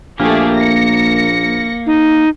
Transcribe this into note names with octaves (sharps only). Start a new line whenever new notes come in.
A#1 A3 A#3 G4 G#4
A#6 C#7
D#4